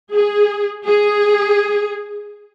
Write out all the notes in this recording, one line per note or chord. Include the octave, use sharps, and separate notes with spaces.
G#4
G#4